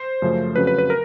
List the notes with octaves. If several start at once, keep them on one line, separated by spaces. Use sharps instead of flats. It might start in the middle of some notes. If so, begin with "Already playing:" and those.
Already playing: C5
F#2 C#3 F3 A3
F2 C#3 F#3 B4
B4
B4
A#4